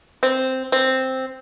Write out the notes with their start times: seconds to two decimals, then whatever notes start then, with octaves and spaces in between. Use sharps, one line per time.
0.23 C4
0.72 C4